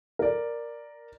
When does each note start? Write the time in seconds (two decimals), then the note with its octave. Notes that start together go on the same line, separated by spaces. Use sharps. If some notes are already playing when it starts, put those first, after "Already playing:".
0.19 A#4 D5